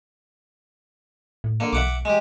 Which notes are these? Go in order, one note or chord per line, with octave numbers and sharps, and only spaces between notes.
A2
D3 A#3
B1 E5 F#5 D6
G#3 G4